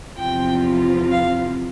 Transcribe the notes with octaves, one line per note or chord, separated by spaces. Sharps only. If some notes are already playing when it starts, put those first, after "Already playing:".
E2 C3 F3 C4 F4 G5
F5